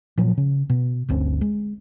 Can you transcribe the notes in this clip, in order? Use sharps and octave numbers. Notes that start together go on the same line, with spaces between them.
A#2 F3 F#3
C#3
B2
G1 D2 C4 C#4
G#3